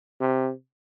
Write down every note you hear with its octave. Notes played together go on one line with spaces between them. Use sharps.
C3